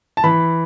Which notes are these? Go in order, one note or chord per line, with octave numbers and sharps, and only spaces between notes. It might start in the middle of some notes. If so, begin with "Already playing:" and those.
A5
E3 B5